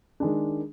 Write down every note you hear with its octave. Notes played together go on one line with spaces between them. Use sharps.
D#3 G#3 D4